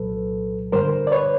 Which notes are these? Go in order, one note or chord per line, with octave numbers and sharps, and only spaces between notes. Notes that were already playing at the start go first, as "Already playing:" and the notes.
Already playing: C2 A#2 F#3 A4 B4
G2 D3 G3 A#4 C5
D5
B4 C#5